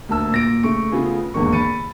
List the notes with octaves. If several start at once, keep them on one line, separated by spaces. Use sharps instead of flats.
D2 A#3 A5 E6
A#2 A#6 D7
C#3 A3 C#6 D7
C#3 A3 B3 F4 G#4
G#1 E2 A#2 D3 A#3 C#6
B5 A6 C#7 D#7